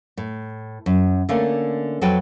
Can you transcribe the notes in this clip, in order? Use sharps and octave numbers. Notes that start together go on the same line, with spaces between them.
A2
F#2
D3 A3 A#3 C#4
F2 F#3 F#4 A4 B4 G5